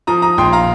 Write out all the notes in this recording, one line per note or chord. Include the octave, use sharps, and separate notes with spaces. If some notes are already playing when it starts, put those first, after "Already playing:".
F3 A#5 D#6
A#5 D#6
A#1 G5 C6
F5 A#5